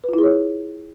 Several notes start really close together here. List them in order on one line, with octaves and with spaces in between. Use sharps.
B4 F4 E4 G#4 C#5